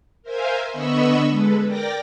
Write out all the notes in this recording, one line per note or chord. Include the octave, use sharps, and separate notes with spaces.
A#4 C5 E5 F5 G#5
D3 B3 D#5 B5 C#6 E6
G#3 A4 B4
A#4 D5 G5 D6 A#6